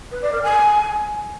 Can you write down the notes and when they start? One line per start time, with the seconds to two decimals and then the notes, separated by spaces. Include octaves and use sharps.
0.11 B4
0.22 D5
0.32 A#4
0.43 G#5